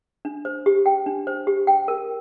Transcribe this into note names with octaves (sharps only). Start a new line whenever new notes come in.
D4
C5
G4
G5
D4
C5
G4
G5
A#4